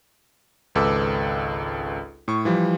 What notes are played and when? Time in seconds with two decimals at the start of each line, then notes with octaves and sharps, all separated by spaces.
0.75 G#1 C#2 A4 B4 D6 E6
2.28 A2 C#6
2.45 E3 F3 G3